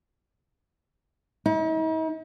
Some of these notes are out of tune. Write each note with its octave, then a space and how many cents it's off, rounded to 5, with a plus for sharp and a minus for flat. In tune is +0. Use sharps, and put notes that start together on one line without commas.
D#4 +45